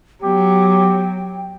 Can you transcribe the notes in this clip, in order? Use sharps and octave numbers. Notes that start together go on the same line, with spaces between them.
F#3 B3 G4 G5